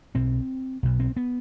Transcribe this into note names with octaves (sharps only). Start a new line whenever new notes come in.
B1 B2 C4
B1 B2
C4
B3